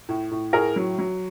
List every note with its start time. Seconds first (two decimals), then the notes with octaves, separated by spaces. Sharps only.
0.09 A2
0.31 A2
0.53 A2 G#4 A#4
0.76 F#3
0.99 F#3